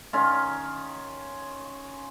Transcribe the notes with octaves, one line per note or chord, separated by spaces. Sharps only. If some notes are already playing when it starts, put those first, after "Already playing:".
D#3 C#4 F4